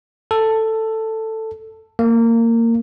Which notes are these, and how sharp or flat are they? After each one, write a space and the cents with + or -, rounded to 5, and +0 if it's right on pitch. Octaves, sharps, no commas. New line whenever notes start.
A4 +10
A#3 -20